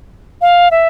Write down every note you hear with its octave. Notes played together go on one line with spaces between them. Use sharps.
F5
E5